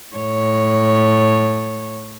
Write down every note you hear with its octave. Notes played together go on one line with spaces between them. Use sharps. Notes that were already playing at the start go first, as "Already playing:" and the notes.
A2 C#5